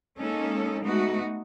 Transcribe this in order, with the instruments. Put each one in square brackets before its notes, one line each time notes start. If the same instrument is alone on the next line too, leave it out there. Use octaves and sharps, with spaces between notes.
[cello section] G#3 A#3 C#4 D#4 A4
G#3 A3 B3 D#4 F#4